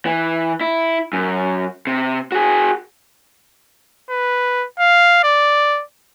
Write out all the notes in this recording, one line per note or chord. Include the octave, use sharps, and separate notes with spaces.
E3
E4
F#2
C3
F#4 G#4
B4
F5
D5